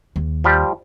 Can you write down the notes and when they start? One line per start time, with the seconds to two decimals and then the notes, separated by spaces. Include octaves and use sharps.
0.16 D#2
0.44 F3 G3 G4